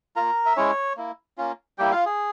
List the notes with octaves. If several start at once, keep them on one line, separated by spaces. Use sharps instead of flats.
A#3 F4 A#4 A#5
E5
G#3 C#4 E4 C#5
A#3 E4
A#3 C#4 F4
G3 A#3 E4 G4 G5
F4 F5
G#4